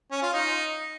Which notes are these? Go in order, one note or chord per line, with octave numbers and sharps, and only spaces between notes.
C#4
F4
D#4